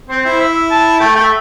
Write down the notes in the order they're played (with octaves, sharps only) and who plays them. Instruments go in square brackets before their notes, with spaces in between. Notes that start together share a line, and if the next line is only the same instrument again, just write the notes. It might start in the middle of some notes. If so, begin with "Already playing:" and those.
[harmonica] C4 [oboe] C5
[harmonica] E4
[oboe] E5
A5
[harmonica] A3 [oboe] G5
[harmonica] A3 [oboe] G5
[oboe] E5